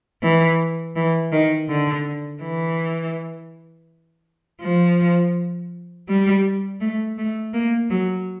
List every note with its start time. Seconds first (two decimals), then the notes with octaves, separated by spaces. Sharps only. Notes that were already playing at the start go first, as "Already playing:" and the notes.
0.22 E3
0.96 E3
1.32 D#3
1.69 D3
2.42 E3
4.62 F3
6.08 G3
6.81 A3
7.18 A3
7.54 A#3
7.90 F#3